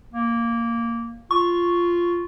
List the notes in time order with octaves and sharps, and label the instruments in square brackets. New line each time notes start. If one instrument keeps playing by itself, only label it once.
[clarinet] A#3
[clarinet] F4 [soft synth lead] C#6